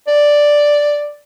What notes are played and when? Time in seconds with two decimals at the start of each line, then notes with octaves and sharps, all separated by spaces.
0.08 D5